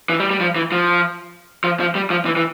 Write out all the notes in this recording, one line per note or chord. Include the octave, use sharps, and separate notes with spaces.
E3
G3
G3
F3
E3
F3
F3
F3
G3
F3
E3
E3